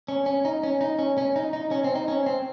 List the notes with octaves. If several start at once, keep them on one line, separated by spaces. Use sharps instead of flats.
C#4
C#4
D#4
C#4
D#4
C#4
C#4
D#4
D#4
C#4
C4
D#4
C#4
C4